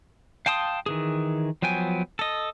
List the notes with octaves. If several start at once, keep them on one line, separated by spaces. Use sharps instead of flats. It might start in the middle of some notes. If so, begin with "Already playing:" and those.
F5 G5 A5 C6 D#6
D#3 E3 G#4
F3 F#3 B3 G5 G#5
A4 D#5